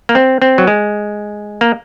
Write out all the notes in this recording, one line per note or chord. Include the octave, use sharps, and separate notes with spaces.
A#3
C4
C4
F#3
G#3
A#3